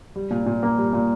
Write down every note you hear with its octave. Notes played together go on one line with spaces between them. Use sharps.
G3
A#2
A#2
A#3
G3
A#2